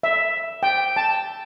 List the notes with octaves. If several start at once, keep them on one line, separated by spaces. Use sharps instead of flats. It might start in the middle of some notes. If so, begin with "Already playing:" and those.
E5
G5
A5